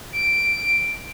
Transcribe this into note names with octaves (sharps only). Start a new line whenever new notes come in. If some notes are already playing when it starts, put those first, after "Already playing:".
D7